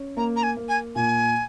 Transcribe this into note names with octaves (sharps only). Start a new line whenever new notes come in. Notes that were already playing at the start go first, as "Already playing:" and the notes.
Already playing: C#4
A#3 A#5
A#5
G#5
A#3
G#5
A#2 G#5